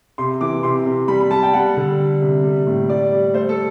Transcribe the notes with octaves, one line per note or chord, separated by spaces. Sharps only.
C3 C6
E3 D6
C3 C6
C3
G3 B5
B5
G3 A5
G5
G3 F#5
D3
G3
C3
G3
A2
G3 D5
G3
A3 C5
A4